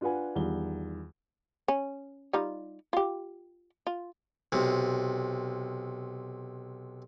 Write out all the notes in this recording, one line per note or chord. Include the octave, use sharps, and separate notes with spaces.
D4 F4 B4 F#5 G#5
E2 D#3 G3 F4 G7
C#4
G3 D#4 F4
F4 G4
F4
B1 C3